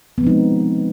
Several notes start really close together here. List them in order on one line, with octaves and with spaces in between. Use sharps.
B3 F3 C4 D#4 G#3